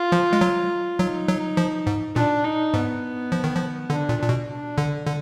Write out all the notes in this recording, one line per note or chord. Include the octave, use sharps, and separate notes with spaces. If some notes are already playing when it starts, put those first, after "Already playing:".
Already playing: F4
F3
G#3
F#3
F#3 D#4
F#3
F3
G#2
A#2 D4
D#4
G#2 B3
F3
D#3
F3
D3 D4
A#2
A#2
B2
D4
D3
D3